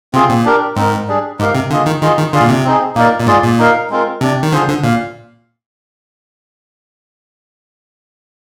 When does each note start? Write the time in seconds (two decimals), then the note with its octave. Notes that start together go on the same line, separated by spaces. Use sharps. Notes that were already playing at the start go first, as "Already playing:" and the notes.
0.14 C3 C4 F4 G#4
0.29 A#2
0.45 D4 G4 A#4
0.76 G#2 C4 D#4 A#4
1.08 G3 D4 G#4
1.39 G#2 D#4 G4 A#4 F5
1.55 C3
1.70 D3 A#3 F4 G#4 D#5
1.86 D#3
2.02 D#3 F4 G#4 D#5
2.17 D#3
2.33 D3 F4 G#4 D5 F5
2.41 A#2
2.49 C3
2.64 C4 D#4 G#4
2.96 A#2 A#3 D#4 A#4 D5
3.20 A#2
3.27 G#2 F4 G#4 D5
3.43 A#2
3.59 D#4 A#4 F5
3.90 G#3 C4 F4 A#4
4.21 C3 D4 G4 D5
4.43 D#3
4.52 D3 D4 F4 G#4 C5
4.68 D3
4.84 A#2 F5